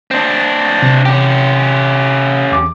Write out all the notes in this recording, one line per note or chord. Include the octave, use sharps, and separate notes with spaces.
C4 D4
C3
C#4 G4
E2 D6